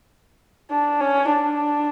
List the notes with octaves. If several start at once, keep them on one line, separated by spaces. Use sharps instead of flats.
D4
C#4
D4